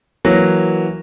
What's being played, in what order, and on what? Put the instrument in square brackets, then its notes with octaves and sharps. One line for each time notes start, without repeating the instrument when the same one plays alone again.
[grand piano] E3 F#3 A#3